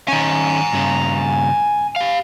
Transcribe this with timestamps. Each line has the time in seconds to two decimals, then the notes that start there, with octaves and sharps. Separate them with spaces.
0.08 D#3 C#4 G#5 A#5
0.73 G2 C#3
1.96 G4 F5